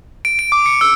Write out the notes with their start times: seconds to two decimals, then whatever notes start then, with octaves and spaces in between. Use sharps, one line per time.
0.25 D7
0.39 D7
0.52 D6
0.66 C#7
0.81 E6